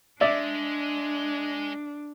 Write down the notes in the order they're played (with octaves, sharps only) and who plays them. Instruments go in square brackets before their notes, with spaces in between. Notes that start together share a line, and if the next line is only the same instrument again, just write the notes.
[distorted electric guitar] G#3 [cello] D4 [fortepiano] D5 E5